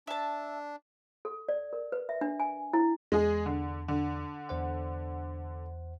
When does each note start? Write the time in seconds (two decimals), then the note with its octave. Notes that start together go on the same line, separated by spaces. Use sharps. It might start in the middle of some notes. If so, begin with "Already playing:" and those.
0.07 D4 E5 A5
1.25 A4
1.49 D5
1.73 A#4
1.92 B4
2.09 E5
2.21 D4
2.40 G#5
2.73 E4
3.12 E2 G#3 G#4
3.46 D3
3.88 D3
4.49 E2 C5 F#5